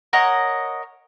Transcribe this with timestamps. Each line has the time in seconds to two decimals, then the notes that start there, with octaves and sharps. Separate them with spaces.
0.13 A#4 C#5 D#5 F#5